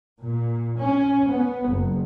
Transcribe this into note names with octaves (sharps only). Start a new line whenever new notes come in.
A#2
C#4
B3
F#1